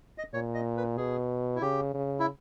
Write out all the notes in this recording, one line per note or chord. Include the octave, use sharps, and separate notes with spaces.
D#5
A#2 C#5
D#5
B4
B2 G#4
E4
C#3 G4
C#3
E4